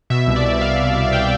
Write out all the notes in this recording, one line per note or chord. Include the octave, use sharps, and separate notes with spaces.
B2 E5
C2
D5
B2
E5
B2 F5
C2
B2
F5
G5